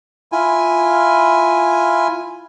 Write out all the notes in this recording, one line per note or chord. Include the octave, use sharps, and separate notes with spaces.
E4 F4 G#5